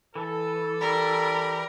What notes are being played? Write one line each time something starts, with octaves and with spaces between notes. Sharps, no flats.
E3 A4
G3 A#4 B5